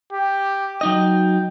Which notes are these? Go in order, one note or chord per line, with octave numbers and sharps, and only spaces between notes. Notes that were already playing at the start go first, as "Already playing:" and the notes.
G4
F#3 D#4 D#5 G5